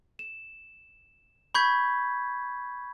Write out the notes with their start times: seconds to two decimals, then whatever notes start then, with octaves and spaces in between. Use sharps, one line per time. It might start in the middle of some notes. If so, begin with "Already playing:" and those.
0.19 E7
1.55 B5 C#6 G6 G#6 B6